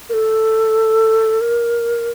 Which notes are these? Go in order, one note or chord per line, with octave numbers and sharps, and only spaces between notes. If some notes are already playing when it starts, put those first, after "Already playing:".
A#4
A4
A#4